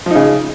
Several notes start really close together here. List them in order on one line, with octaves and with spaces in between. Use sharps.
F3 D#4 C#3